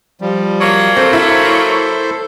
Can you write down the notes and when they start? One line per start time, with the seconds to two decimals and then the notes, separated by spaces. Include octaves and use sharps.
0.21 F3 G3
0.61 F#3 A#3
0.97 C4 A4 C5
1.13 E4